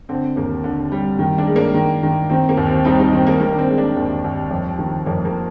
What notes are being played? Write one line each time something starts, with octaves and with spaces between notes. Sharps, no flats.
D3 C4
D#2 A#3
D3
G3
D#3
A#3 D4
G#3
A#3 D4
D#3
D#3
D#3 C4
A#3
D#2
C4
G3 C4 D#4
C4 D#4
D#3 C4
A#3
D#3 A#3
D4
C4
G#3
A#3 D4
D#2 C4
D#2
F2
D#3
F2 A#3
A#3